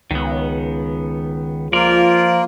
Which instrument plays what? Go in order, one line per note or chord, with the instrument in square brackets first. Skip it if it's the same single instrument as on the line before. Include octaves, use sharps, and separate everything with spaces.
[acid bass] C#2 [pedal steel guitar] D#3 B3
[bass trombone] F3 [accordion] A#3 F4 [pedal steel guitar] A#4 D5